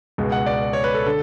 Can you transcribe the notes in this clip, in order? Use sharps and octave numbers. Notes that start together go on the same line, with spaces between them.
C#2 B2 G#3
F#5
D5
C#5
B4
A4
D3 A4